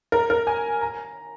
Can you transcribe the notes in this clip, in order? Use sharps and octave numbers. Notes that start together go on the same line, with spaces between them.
A#4
A#4
G#5
A#5